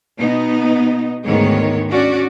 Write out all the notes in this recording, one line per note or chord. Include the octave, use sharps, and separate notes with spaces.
B2 B3 D#4
D2 G#2 D#3 G#3 B3 C#5
C#4 D4 F#4 D5